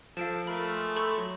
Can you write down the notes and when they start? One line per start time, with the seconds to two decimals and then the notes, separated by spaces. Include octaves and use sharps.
0.17 F3 A4 F5 D7 E7
0.47 A3 A#4 B5
0.71 G#3
0.96 A4 B5 C#6 G6
1.18 F#3